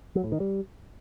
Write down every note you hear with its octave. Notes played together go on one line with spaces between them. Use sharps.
F#3
A2
D#3
G3